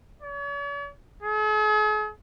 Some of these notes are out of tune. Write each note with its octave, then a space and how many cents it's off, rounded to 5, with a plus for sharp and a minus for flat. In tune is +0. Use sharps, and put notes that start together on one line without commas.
C#5 +45
G#4 +45